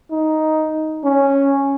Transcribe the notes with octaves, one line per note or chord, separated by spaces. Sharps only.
D#4
C#4